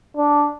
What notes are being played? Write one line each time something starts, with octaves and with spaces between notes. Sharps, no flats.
D4